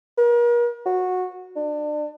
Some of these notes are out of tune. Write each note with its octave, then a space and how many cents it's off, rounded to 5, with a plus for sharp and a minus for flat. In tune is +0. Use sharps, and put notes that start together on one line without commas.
A#4 +40
F#4 -15
D4 +30